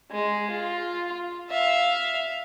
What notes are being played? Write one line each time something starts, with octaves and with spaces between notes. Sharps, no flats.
G#3
F4
E5 F5